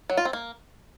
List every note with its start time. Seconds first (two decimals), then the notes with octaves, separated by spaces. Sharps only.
0.10 F#3
0.17 F4
0.25 C4
0.33 A#3